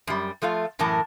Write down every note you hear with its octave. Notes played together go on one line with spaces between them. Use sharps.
F#2 G3
F3 A3 F4 F5
F#2 A2 E3 A#4 A5